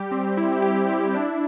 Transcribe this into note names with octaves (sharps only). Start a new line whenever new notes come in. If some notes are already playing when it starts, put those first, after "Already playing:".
Already playing: G3 G4
C4
E4
G4
E4
D4